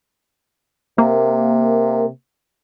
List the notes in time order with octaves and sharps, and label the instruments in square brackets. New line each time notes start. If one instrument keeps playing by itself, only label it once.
[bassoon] C3 [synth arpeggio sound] A#3